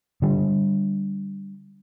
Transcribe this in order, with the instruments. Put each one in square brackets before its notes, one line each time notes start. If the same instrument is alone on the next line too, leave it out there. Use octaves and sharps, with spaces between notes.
[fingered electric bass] D3 G3